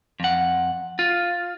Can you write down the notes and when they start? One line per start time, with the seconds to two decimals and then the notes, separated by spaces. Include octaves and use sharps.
0.20 F2 F#5
0.99 F4